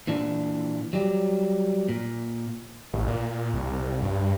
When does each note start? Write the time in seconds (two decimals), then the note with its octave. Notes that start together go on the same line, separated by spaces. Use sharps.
0.07 A#2 E3 D4
0.93 F#3 G3
1.89 A#2
2.94 A1
3.08 A#2
3.54 C2
4.02 G2